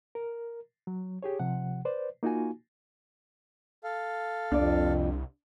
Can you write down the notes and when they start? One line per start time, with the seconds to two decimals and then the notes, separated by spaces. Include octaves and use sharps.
0.15 A#4
0.87 F#3
1.23 G4 G#4 C#5
1.39 C3 F3 F#5
1.85 B4 C5 D5
2.23 A#3 D#4 F4 F#4 G#5
3.84 A4 F5
4.52 C2 F2 D4 D5